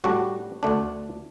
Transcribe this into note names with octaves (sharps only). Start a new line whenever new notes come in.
A2 G3 D4 F#4
D2 D3 A3 D4